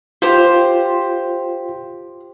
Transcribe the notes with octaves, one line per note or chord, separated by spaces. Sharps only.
F4 G4 C5